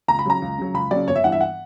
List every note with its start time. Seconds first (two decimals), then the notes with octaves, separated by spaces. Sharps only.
0.08 C#2 A#5
0.19 B5
0.25 C#3 F#3 A#5
0.42 C#2
0.58 C#3 F#3
0.74 C#2 B5
0.91 C#3 F#3 D5
1.08 G1 C#5
1.16 E5
1.24 G2 E3 F#5
1.32 E5
1.41 F#5